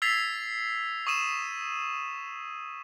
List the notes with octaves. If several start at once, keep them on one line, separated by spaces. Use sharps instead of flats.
E6 G#6 A6 B6 C7 F7
C#6 D#6 D#7 E7